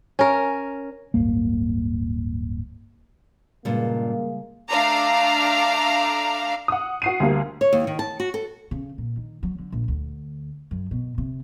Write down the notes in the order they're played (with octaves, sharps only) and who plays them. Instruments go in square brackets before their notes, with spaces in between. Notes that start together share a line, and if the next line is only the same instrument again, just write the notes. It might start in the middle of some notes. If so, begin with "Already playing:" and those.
[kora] C#4 A#4
[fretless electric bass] D1 G1 A#3
[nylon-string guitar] G2 A#2 [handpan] C#3 G3 G#3 [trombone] A#3
[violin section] A3 D4 F5 A#5 D6
[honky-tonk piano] F#5 D#6
F#4 C7 D#7
D2 G3 A#3
[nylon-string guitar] C#5
D#2
D#3
A5
F#4
A4
[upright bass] C#3
A#2
D#3
F#3
D3
A#1
D2
F#2
B2
C3